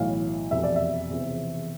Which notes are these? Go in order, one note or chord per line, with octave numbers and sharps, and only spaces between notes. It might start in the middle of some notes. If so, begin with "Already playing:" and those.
Already playing: B1 A2 E3 F5
F1 E2 B2 E5
D5
E5
E1 E2 C3 F3